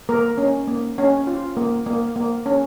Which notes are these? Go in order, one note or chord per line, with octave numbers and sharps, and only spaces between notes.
A#3 A#4
C#4
A#3
C#4
F4
A#3
A#3
A#3
C#4